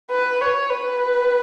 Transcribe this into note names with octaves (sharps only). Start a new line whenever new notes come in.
B4
C#5
B4